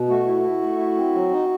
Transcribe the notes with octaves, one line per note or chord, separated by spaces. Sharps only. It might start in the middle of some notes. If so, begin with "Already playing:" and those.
Already playing: B2
A3 F#4
E4
E4
A3
E4
C4
F#3
D#4